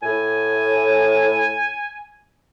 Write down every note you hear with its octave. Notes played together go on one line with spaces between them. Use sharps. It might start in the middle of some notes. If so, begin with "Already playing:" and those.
A2 G#5